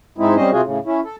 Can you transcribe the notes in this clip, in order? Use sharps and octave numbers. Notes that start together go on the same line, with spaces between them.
G#2 G#3 C4 D#4 E4
G3 C4 C#4 C5 D#5
C3 F4 F#4 G#4
A2 C#3
C#4 E4
A4